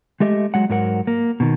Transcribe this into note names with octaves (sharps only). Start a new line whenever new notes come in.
G#3 A3 G4 D#5 E5
F#3 G#3 F#5
G#2 F#3 A#4 F#5
A#3
B2 D#3